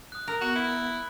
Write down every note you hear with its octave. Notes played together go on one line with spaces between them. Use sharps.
D#6 F#6
A#4
B3 F#4 F#6
E4 B5